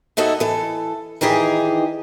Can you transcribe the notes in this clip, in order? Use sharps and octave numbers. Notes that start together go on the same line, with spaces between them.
D#4 E4 F#4 A4 D#5
E3 A4
D#3 E3 D#4 G4 G#4